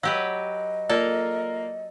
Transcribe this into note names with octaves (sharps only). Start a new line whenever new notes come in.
F#3 G4 B4 D#5 F5 E6
A#3 F4 A4 A#4 D5